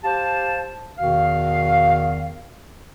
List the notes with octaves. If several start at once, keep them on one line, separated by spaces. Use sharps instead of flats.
G4 C5 F5 A5
E2 B2 D#3 F#4 F5